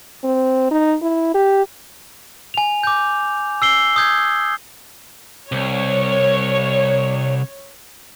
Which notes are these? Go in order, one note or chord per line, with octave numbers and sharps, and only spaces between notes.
C4
D#4
E4
G4
G#5 F7
D6 G6
E6 C7 G7
D#6 G6 G#6
C2 C#5